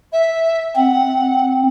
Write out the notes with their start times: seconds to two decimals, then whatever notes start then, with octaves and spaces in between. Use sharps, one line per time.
0.12 E5
0.76 C4 F#5